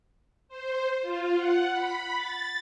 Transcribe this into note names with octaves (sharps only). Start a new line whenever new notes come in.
C5
F4
F#5
B5
A6